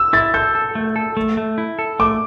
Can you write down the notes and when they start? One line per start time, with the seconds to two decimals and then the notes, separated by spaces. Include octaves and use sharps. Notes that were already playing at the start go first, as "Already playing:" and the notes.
Already playing: E6
0.13 E4 A6
0.34 A4 G6
0.55 A4
0.75 A3
0.96 A4
1.17 A3
1.37 A3
1.58 E4
1.79 A4
2.00 A3 D6